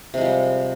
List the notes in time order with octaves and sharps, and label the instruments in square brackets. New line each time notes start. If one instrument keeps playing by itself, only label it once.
[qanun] C3
G#3
F3
G3